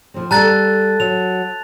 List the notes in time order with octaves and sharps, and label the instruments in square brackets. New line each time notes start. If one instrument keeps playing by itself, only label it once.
[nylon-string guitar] F3 C4
[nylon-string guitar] G3 A4 [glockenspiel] A5 F#6 A6 [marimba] A#5
[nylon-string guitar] F#3 [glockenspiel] F7